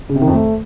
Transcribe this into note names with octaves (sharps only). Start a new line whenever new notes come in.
C#3
C3
D#3
F2
A3